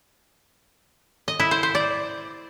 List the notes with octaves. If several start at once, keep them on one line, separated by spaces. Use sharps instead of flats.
D#5
E4
C5
C5
D5